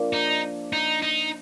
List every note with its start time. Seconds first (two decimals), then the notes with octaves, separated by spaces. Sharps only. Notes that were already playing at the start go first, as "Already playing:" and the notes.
Already playing: F3 A#3 D4
0.13 D#4
0.73 D#4
1.03 D#4